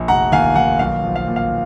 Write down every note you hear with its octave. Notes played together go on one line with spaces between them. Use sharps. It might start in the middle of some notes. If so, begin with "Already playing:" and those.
Already playing: A#1
F1 F#5 A#5
D#2 F5 G#5
D#2 F#5
B1 F5
F3
F5
A#2
F5